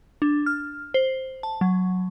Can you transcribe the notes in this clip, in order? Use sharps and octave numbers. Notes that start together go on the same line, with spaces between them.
D4
F6
C5
A5
F#3